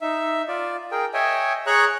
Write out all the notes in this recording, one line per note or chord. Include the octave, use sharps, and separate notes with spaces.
D#4 E5
F4 D5
G#4 A#4 G5
C#5 D#5 E5 G5 G#5
G#4 C#5 A#5 C#6 F#6